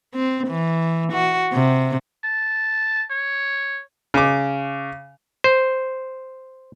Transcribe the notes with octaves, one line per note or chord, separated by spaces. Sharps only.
C4
E3
F#4
C3
A5
C#5
C#3 D6
C5